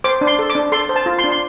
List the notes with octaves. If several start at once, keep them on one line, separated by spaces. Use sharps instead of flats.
C5 D6
D4
C6
A4
D6
D4
A4 C6
C5
A5
F4
C6
D4
C6